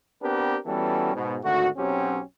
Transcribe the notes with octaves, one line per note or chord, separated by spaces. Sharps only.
B3 C4 D4 G4 A#4 B4
E3 G3 B3 C#4 F#4 A4
G#2 B2
G#1 D3 A3 F#4
B1 F#3 C4 C#4 G4